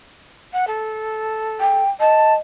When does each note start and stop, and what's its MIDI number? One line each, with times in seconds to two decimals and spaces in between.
0.53 0.65 78
0.67 1.82 69
1.60 1.90 79
2.00 2.36 75
2.00 2.33 81